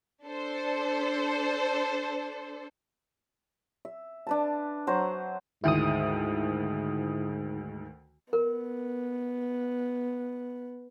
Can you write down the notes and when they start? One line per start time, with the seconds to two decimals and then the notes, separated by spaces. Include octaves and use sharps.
0.25 D4 A4 C5
3.85 E5
4.27 D4 B4 A5
4.87 F#3 C5 A#5 C#6
5.64 D2 G#2 D#3 E4 D#6
8.33 B3 A#4